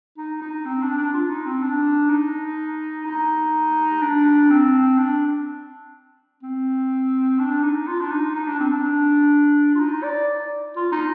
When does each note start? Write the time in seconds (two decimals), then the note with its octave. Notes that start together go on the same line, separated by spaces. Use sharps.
0.17 D#4
0.42 D#4
0.65 C4
0.82 D4
0.98 D4
1.13 F4
1.29 D#4
1.46 C4
1.62 D4
2.10 D#4
3.06 D#4
4.02 D4
4.50 C4
4.98 D4
6.43 C4
7.39 D4
7.63 D#4
7.87 F4
8.01 D4
8.11 D#4
8.35 D#4
8.47 D4
8.60 C4
8.71 D4
9.75 F4
9.80 D#4
10.03 D5
10.76 F4
10.92 D#4